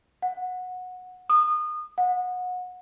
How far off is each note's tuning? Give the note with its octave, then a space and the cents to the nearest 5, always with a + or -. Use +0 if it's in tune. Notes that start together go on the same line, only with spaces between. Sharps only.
F#5 -15
D#6 -30
F#5 -25